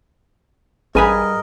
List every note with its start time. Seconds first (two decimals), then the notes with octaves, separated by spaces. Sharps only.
0.95 A1 G2 G#4 A#4 B4 D#5 G#5 B5